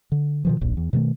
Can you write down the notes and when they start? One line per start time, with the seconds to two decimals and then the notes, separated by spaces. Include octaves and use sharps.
0.12 D3
0.45 B2 D#3 F3
0.61 D1 A#1
0.77 E2
0.93 B2 D#3 F#3 A3